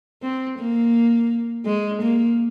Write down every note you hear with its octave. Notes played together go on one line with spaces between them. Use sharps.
C4
A#3
G#3
A#3